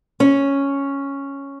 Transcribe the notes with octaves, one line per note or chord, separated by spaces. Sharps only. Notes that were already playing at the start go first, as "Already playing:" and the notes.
C#4